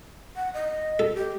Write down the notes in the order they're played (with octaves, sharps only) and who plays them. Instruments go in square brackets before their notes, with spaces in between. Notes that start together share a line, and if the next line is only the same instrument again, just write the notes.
[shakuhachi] F#5
D#5
[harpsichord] A4
[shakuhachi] G4